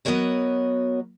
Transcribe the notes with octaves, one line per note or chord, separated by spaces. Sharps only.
F#3 B3 F#4 A#4 C#5 D#5